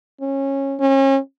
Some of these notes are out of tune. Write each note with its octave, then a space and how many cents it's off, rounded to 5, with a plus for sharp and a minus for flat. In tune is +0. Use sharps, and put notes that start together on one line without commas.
C#4 -20
C#4 -35